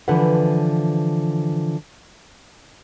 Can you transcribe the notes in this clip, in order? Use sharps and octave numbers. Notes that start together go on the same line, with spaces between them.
D3 E3 F3 B4 F#5